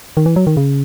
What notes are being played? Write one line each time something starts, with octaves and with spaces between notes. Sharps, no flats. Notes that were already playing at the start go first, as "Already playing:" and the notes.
D#3
E3
F#3
D#3
C#3